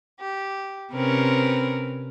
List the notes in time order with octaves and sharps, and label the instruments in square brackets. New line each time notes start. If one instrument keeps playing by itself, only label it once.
[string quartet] G4
[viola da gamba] C3 C#4 A#4 [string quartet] C4 B4